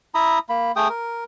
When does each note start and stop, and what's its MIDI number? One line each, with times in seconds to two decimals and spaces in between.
0.15 0.39 64
0.15 0.39 82
0.15 0.39 83
0.15 0.39 87
0.49 0.72 58
0.49 0.72 83
0.76 0.88 57
0.76 0.88 68
0.76 0.88 79
0.76 0.88 87
0.89 1.24 70